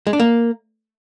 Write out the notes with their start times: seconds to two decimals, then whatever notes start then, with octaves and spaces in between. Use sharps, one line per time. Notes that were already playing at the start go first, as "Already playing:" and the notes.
0.07 G#3
0.13 D4
0.20 A#3